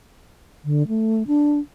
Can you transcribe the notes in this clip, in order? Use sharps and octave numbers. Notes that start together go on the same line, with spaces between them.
D3
A3
D4